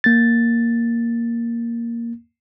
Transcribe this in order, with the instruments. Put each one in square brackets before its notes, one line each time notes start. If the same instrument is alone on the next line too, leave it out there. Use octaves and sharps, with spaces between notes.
[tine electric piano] A#3 A6